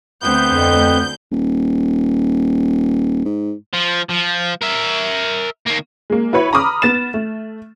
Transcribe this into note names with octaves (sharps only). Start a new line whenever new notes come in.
D2 B3 C4 G6
F2
D#1
G#2
F3
F3
A#4 E5
D#3 A#3
G#3 A#3
E4 F#4 B4 C#5 B5
A#5 B5 D6 D#6 F6
B3 A6 E7
A3